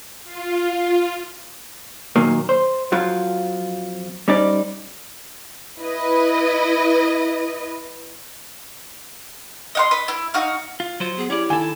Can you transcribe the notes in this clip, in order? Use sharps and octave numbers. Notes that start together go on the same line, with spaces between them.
F4
A#2 D#3 F#3 A#3
C5
F2 F3 F#3 F4
G3 C#4 D#4 C5 D5
E4 B4 D#5
D#5 F#5 C6
B4 D#5
E4
D#4 F#4 F5
F4
F#3 F4 C5
B3 G#4
C#4 E4 G4 D5
D#3 A4 G#5